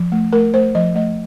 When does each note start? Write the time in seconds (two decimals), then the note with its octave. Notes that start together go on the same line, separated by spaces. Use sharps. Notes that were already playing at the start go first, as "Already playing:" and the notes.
Already playing: F3
0.12 A3
0.33 A3 A#4
0.54 A3 C5
0.75 F3 D#5
0.96 A3 D#5